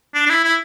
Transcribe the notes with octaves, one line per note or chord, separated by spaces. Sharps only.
D4
D4
E4
E4